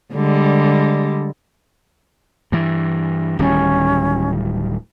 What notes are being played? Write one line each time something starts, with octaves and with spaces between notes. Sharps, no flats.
D3 G3 G#3
G2 E3
D1 D#3 G3 C#4